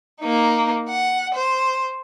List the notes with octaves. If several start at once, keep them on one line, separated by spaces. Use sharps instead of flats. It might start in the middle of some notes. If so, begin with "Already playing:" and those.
A#3 D#4
F#5
C5